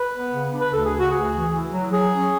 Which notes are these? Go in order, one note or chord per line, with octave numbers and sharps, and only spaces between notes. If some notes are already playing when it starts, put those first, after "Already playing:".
Already playing: B4
B3
C#3
D4
B4
D2 A4
G#4
C#3
F#4
D2 G#4
E3
E4
F#3
F#3 G#4
C#4